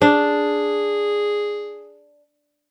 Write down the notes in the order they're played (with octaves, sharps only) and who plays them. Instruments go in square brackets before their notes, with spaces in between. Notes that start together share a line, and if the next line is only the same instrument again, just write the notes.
[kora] D4 [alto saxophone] G#4